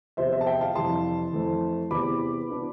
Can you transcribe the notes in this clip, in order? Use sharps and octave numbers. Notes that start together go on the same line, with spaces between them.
E2 C3 F3 C5 E5
C5 E5
A5
E5 G5
F5 A5
F2 C3 E3 G3 A5 C6
F2 E3 A3 C4
E2 C3 E3 B3 B5 D6
B2 B3 D4